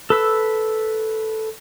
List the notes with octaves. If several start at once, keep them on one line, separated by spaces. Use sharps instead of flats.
A4 B4 E6